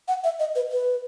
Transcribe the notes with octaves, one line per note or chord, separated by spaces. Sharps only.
F#5
E5
D#5
B4
B4